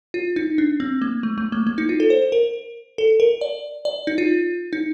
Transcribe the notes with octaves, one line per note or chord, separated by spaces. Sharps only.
F4
D#4
D4
C4
A#3
A3
A3
A#3
A#3
D#4
F4
A4
C5
A#4
A4
A#4
D5
D5
D#4
F4
D#4